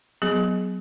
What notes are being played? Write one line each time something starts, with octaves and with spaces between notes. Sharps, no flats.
F#3 B3 G#4